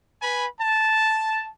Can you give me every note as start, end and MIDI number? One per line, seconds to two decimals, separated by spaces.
0.22 0.46 71
0.22 0.46 80
0.22 0.46 83
0.60 1.51 81